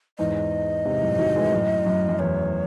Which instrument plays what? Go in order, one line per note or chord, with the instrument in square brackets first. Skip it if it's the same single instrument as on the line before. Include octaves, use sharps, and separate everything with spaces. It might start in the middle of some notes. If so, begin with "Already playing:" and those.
[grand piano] E2 G#2 [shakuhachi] D#5
[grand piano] G#2 C3
F#2 A2
D#3 F#3
E3 G#3
F#2 A2
F#2
F#2
[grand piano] E2 [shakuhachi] C#5